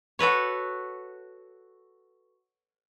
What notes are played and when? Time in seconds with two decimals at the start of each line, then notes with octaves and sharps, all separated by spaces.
0.19 F#4 A4 B4 C#5